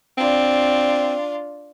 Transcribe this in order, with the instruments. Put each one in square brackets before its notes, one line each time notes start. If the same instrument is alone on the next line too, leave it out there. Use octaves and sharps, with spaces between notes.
[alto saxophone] C4 [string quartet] D4 F4